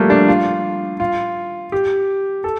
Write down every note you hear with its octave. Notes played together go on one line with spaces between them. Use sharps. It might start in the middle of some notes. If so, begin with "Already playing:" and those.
Already playing: F3 G3 A3 A#3
D4
F4
F4
G4
A4